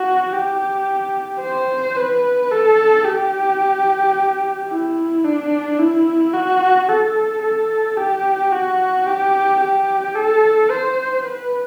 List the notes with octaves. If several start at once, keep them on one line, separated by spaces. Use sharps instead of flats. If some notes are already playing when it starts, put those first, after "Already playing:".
Already playing: F#4
G4
C5
B4
A4
G4
E4
D4
E4
F#4
A4
A4
G4
F#4
G4
G4
A4
C5
B4